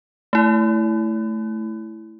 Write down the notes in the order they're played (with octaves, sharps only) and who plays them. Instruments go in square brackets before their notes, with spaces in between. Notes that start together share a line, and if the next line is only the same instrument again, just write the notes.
[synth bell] A3 E4